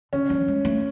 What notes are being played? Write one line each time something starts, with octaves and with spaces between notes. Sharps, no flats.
D3 C#4
F3
G#3
A3